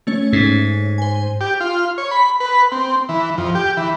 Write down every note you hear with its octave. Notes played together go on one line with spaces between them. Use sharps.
A3 C#4 C#5
G#2
C5 G#5
G4
F4
C#5
B5
B4
C4
E3
F2
G4
E3